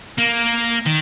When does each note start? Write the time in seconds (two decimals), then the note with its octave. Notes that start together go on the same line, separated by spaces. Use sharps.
0.18 A#3
0.86 D#3